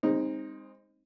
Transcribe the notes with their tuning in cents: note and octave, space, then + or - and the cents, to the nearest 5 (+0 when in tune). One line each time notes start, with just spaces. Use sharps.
G#3 -35 C4 +15 D#4 +0